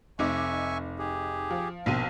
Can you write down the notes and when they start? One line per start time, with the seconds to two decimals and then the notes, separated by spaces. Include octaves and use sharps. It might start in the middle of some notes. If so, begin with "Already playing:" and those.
0.19 F1 D#4 E5 G#5 C#6 D6
0.99 G4 G#4
1.50 F3
1.86 A#1 B2 D#3 C4 D#7